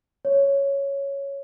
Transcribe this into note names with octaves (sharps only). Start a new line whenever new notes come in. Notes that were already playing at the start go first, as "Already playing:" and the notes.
C#5